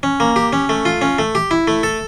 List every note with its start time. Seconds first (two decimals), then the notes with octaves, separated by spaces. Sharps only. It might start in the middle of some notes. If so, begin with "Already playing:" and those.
0.03 C#4
0.20 A#3
0.36 G4
0.53 C#4
0.69 A3
0.85 F4
1.01 C#4
1.19 A3
1.35 G4
1.51 E4
1.68 A3
1.83 A4